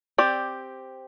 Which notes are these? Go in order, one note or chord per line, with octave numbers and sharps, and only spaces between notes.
C4 G4 D5